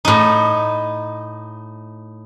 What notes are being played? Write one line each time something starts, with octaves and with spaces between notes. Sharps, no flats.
A2 D#4